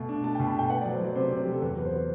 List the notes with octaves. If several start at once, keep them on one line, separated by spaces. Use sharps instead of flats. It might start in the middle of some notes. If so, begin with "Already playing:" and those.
Already playing: B2 A3
D4
A3 A5
G5
B2
B5
A3 G5
B3 F#5
D5
F#3
C5
F#3 D5
C3 C5
C3
F#3 G4
A4
E2 B4
B3
C5
B3